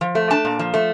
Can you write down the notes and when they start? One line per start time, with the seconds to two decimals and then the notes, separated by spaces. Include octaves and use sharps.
0.01 F3
0.15 A3
0.30 D4 A5
0.45 A#2
0.59 F3
0.74 A3